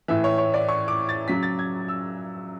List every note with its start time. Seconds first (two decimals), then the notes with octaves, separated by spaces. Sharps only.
0.08 A2 E3 E5
0.24 C#5
0.38 C#5
0.54 D5
0.69 C#6
0.88 D6
1.09 A6
1.28 C#3 F#3 B6
1.43 A6
1.59 G#6
1.88 E6